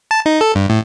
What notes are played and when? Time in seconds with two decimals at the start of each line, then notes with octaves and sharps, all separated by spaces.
0.11 A5
0.26 D#4
0.41 A4
0.55 G2
0.70 A2